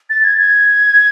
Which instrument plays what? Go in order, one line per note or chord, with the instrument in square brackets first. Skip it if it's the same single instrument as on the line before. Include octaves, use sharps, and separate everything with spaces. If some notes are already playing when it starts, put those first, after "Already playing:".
[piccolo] A6
G#6
G#6